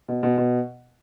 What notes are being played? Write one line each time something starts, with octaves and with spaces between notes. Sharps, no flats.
B2
B2
B2